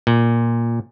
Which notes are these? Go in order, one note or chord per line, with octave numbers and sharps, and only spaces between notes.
A#2